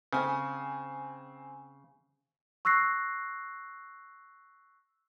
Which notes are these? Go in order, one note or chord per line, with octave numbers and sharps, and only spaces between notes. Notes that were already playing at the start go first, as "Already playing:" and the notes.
C#3 C4 G#5
C#6 E6 F#6 A#6 C7